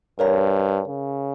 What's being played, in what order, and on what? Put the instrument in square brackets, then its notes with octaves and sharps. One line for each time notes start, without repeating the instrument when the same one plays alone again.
[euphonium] G2 [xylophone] A#4 C#5 F5 A#5
[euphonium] C#3